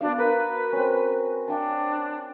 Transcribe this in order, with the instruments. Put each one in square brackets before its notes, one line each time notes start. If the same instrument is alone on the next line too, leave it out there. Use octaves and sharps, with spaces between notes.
[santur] B3 F#4 F5 [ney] D4
[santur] A#4 [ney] B4
[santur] C4 C#4
[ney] D4 [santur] F#5 G5 A5